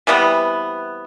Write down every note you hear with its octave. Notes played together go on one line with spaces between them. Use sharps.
C3 E3 G3 B3